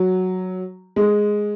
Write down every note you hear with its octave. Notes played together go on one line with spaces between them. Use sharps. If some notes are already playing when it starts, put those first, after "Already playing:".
Already playing: F#3
G#3